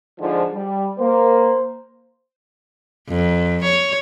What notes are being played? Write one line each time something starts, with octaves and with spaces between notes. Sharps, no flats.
G#2 D3 F3
G3
A#3 C5
F2
C#5